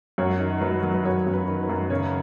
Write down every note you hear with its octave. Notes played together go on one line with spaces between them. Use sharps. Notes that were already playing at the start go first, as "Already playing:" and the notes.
F#2 C#5
D#3
F#3 B4
F#3
B4
F#2 C#5
F#2
B4
D#3
B4
F#2
C#3 C#5